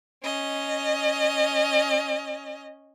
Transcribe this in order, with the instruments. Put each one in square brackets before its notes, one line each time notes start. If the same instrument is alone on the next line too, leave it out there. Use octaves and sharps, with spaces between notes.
[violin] C#4 D#5